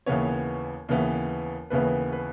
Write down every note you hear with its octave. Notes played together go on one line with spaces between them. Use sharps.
D#2 C#3 E3 B3 C#5
D#2 C#3 E3 B3
D#2 C#3 E3 B3 B4
B4